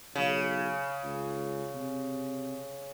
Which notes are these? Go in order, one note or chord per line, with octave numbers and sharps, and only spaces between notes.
B1 C#3
C#2
C3